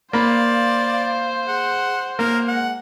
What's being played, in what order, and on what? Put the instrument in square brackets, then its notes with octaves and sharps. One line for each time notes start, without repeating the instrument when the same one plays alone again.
[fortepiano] A#3 B5 [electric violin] C5 [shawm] D5 [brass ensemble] F5
[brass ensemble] G#4 [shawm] F#5
[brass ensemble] B1 [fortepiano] A#3 [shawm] A#4
[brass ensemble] G#3 G#4 [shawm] F#5